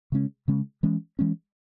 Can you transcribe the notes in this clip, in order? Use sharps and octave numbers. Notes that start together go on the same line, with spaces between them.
C#3 G#3 C#4
C#3 G#3 C#4
E3 G#3 C#4
E3 G#3 C#4